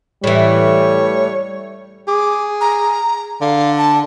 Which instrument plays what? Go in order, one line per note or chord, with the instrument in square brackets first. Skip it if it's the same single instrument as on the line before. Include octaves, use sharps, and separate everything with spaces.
[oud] A2 E3 [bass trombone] G3 [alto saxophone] C#5
[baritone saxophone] G#4 [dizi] D6
[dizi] A#5
[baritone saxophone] D3 [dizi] F5
[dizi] A5